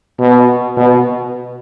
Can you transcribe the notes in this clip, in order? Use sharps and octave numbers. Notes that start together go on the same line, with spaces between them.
B2
B2